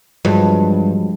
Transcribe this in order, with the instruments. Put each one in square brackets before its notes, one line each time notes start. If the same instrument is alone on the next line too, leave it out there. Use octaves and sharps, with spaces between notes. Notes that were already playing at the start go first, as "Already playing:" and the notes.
[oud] G2 [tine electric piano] F3 F#3 G#3